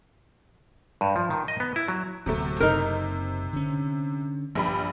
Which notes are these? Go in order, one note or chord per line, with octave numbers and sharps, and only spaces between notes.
G2
F3
D#3
D#5
B3
E4
F#3
D1 C3 F#3 A3
F#1 C3 D#4 A#4
D3 C#4
A#1 G2 G3 B5